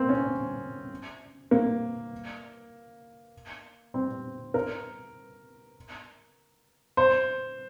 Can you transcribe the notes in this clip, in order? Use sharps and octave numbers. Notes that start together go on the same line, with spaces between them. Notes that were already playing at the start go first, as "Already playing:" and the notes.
Already playing: A#3 C4
C#4
A#3
C4
A#4
C5